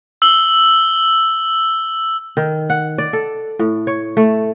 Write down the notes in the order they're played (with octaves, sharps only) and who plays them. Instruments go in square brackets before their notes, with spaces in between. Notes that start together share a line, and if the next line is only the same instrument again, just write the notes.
[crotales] E6 F#7 G7
[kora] D#3
F#5
D5
A4
A2
C#5
A3